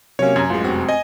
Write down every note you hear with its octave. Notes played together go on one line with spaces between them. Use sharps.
C3 F#3 A#3 C#4 C#5
F#2 G#5 A#5 G#6
A1 G#3 F4
F1 G#3 C4 F#4
D#5 G#5